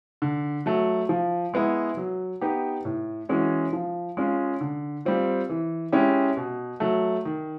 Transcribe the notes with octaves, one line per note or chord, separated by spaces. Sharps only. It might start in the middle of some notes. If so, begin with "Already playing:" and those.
D3
F#3 A3
F3
G#3 B3 E4
F#3
B3 D#4 G4
A2
E3 G#3 C#4 F#4
F3
G#3 C#4 F4
D3
G3 C4 F4
E3
G#3 C#4 E4 G4
B2
F#3 A3
D#3